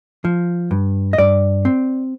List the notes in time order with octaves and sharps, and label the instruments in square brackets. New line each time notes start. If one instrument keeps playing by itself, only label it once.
[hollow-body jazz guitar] F3
G2
D#5
G2 D5
C4